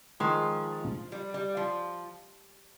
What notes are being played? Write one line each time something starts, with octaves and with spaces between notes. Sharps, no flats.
D#3 F3 G#3 D#4
G3
G3
F3